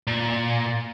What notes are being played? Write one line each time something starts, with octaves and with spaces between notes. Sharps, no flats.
A#2